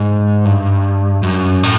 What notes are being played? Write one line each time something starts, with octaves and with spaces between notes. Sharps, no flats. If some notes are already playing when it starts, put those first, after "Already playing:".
Already playing: G#2
G2
F#2
A2